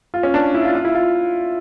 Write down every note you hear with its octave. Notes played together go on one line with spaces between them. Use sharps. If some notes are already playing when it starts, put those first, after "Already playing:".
F4
C#4
D4
E4
F4
F4
E4
F4